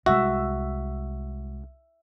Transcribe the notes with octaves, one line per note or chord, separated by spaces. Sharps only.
C2 G#3 F#4 E5